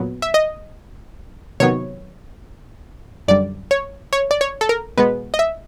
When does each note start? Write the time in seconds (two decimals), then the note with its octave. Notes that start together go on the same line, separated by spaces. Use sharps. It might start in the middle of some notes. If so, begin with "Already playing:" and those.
Already playing: A#2 F#3 B3
0.22 E5
0.34 D#5
1.60 C3 D#3 F#3 B3 C#5
3.28 F#2 D3 G3 D5
3.71 C#5
4.13 C#5
4.31 D5
4.41 C#5
4.61 A4
4.69 A#4
4.97 B2 G#3 B3 B4
5.34 D#5
5.39 E5